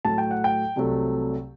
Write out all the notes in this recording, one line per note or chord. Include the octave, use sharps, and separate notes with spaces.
A2 F#3 A3 A5
G5
F#5
G5
C2 C3 F#3 A3